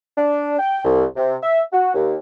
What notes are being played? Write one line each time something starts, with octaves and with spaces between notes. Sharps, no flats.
D4
G5
C2
C3
E5
F#4
D#2